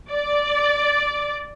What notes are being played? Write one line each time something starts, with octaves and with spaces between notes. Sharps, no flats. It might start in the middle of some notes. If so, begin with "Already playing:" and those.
D5